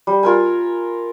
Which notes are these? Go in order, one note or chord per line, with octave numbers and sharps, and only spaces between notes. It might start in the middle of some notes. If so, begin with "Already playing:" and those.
G3
F4 A#4 G#5